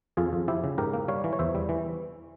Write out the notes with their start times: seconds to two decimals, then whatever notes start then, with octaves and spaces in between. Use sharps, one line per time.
0.17 F2 F4 G#4
0.33 F2
0.48 F3 E4 G4
0.64 C#3
0.78 G#2 G4 A#4
0.93 A#3
1.08 G3 C#5 F5
1.24 E3
1.33 C#5
1.39 E2 C5 E5
1.55 G3
1.69 E3